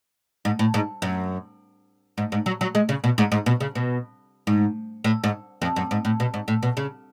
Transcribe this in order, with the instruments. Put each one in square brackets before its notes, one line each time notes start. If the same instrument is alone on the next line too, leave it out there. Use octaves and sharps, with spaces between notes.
[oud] G#2
A2
G#2
F#2
G#2
G#2
F#3
F#3
G#3
C#3
B2
G#2
G#2
B2
C#3
B2
G#2
A2
G#2
F2
F#2
G#2
A2
B2
G#2
A2
B2
C#3